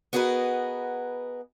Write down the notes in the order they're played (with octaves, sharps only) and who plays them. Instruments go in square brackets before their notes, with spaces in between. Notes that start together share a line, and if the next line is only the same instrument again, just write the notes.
[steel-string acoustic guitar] B3 F#4 G#4 A#4 B4 D#5